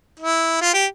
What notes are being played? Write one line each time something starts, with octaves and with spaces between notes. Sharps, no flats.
E4
F4
G4